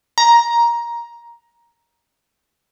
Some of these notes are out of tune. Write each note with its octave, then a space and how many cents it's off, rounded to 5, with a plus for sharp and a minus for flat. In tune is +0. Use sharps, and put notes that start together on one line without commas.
A#5 +10